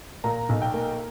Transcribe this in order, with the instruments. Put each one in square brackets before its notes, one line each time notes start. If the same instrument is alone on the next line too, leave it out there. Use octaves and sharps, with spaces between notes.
[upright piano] A#2 A#5
B1
G5
A#3